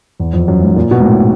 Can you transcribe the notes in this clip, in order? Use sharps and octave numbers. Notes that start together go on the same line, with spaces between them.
E2
F2
F#2
G#2
A#2
B2
G#2
A2